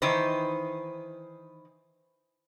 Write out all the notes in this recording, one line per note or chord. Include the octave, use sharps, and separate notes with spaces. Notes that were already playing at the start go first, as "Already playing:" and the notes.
D#3 E3 D#4 B4 C5